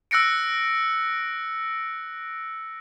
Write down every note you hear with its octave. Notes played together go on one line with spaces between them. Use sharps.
E6 F#6 A#6 C#7 D7